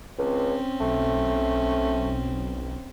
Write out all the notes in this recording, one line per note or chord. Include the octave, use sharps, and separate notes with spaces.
C#2 C4 C#4
B1 A3